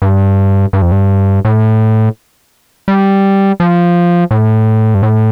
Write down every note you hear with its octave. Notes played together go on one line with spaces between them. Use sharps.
G2
G2
F2
G2
A2
G3
F3
A2
G2
A2